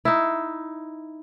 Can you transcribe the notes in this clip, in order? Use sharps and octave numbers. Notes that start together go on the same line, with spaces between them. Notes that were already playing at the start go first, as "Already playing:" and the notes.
D#4 E4